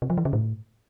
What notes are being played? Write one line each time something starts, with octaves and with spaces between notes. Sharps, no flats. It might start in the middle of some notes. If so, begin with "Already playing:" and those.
C3
F3
E3
C#3
A2